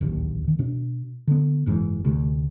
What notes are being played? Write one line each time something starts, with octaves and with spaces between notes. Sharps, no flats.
D1 A#1 D#2
D#3
B2 D4
D3 B3
F#1 G#2 B2 E3
D2 C3 A3